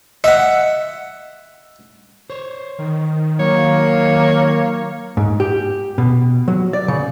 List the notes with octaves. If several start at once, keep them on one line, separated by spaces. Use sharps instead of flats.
D#5 E5 F#5
C5 C#5
D#3
F#3 A#3 C#5
G#2
G4
B2
F#3
D5
C#3